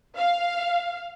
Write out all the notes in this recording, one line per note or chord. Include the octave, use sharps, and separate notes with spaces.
F5